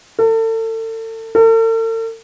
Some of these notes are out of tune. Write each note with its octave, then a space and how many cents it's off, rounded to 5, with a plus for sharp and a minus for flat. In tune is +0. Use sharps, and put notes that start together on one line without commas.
A4 +35
A4 +45